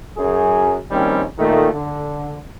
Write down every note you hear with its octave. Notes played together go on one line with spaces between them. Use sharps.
F#2 G#4
A#1 D#2 D#3 G3 C4 C#4
A#2 D#3 A3
D3